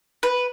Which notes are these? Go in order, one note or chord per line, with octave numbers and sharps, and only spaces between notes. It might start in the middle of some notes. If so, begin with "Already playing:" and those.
B4